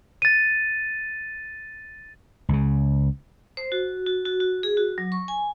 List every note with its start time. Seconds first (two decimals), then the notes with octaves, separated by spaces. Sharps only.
0.22 A6 D#7
2.49 C#2 C#3
3.57 C5
3.72 F#4
4.07 F#4
4.25 F#4
4.40 F#4
4.63 G#4
4.77 F#4
4.98 F#3
5.12 C#6
5.28 G#5